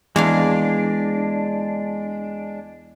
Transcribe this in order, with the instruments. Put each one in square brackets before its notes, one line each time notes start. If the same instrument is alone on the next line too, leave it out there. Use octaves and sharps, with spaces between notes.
[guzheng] E2 A#3 F5 [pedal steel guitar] G#3 D4